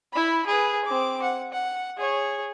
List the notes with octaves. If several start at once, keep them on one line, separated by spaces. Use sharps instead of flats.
E4 B5
G#4 B4
C4 D6
F#5
F#5
G#4 C#5